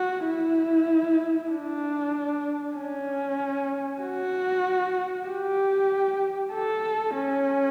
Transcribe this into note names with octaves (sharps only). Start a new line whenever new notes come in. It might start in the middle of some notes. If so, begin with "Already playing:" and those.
Already playing: F#4
E4
D4
C#4
F#4
G4
A4
C#4